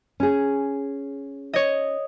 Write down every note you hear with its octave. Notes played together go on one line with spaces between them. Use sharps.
C#4 G#4
C#5 D#5